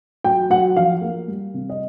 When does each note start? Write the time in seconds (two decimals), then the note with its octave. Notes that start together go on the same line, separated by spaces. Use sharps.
0.24 F#3 G5
0.50 F#3 F#5
0.76 F3 F5
1.01 A#3
1.28 G3
1.54 C3
1.69 D#5